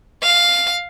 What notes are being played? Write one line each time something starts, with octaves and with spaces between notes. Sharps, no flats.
F5